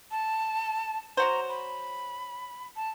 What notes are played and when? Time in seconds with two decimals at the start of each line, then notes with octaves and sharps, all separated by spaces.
0.11 A5
1.17 F#3 F#4 C5 A#5
1.49 B5
2.76 A5